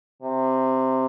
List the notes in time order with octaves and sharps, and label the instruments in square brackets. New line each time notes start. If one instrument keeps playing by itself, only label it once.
[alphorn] C3